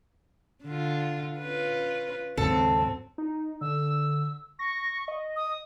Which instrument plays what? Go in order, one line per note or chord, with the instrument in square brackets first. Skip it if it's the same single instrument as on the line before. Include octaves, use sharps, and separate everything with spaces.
[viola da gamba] D3 F4
C#4 F4 B4
[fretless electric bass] D#2 G#2 C#3 [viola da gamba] F#3 C4 [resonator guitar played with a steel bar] A4
[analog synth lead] D#4
[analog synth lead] D3 [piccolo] E6
[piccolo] C#6 [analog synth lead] A#6
[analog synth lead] D#5
[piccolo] D#6